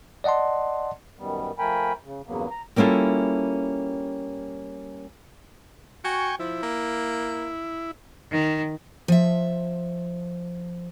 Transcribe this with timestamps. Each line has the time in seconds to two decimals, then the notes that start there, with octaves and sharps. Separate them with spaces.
0.24 D5 D#5 F#5 A5 C6
1.19 F#2 D#3 G3 B3
1.59 F3 A3 A#4 G5 G#5 B5
2.04 C#3
2.28 E2 G2 C#3 F#3 A#3 B3
2.50 A#5
2.76 G3 A#3 C#4 E4 F4 A4
6.05 F#4 G5 G#5 C#6
6.40 F3 E4
6.63 A#3
8.31 D#3
9.08 F3 E5